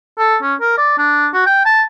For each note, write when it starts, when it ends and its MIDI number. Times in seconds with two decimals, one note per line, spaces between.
0.18 0.36 69
0.42 0.54 61
0.61 0.75 70
0.77 0.95 74
0.98 1.27 62
1.33 1.44 66
1.46 1.64 79
1.65 1.82 81